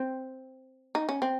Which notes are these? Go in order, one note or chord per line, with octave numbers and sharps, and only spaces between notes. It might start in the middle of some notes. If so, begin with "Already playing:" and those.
Already playing: C4
D#4
C#4
C4